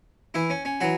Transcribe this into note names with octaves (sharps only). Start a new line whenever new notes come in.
E3 E4
C#4
C#4
E3 F#3 F#4